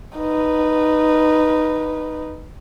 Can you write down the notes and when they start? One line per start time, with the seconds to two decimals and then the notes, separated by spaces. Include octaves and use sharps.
0.18 D#4 B4